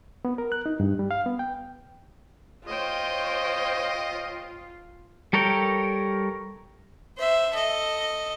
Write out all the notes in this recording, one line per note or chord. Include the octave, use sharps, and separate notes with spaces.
B3
A#4
F#6
D#4
G2
G3
F5
B3
G5
F4 C5 C#5 D#5 G5
G3 A4 A#4 C#5 G5
C5 E5
A4 D#5